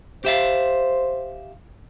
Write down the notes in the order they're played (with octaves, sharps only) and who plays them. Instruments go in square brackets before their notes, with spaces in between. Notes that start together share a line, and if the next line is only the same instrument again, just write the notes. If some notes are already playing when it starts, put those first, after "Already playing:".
[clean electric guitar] G4 E5 F5 [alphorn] C5